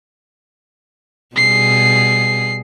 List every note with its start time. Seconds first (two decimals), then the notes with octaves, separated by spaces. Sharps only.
1.36 B2 G3 G#4 C7